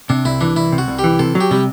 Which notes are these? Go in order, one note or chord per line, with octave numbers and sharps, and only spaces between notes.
C3 D4
C2 E4
E3 D4
C2 E4
C3
F#4
C2
G4
E3
C3 A4
F#3
G4
C3 G3